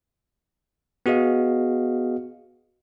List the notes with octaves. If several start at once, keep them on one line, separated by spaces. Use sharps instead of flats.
B3 F#4 G#4 D#5 F5